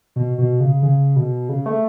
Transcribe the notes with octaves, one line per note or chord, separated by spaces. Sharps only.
B2
B2
C#3
C#3
B2
C#3
A3